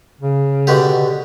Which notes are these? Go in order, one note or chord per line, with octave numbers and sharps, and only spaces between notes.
C#3
B2 D3 G4